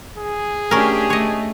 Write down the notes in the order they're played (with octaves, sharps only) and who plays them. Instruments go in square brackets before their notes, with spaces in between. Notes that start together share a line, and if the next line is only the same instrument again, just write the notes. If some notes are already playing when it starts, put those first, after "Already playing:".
[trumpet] G#4
[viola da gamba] A3 D4 G4 [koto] C#4 A#4
[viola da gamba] A3 [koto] C#5 D#5